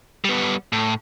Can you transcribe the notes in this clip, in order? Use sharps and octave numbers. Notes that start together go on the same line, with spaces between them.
G3 B3
A2